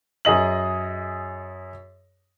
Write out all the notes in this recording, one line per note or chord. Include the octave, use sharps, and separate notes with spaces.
F#2 G#4 D#5 F#7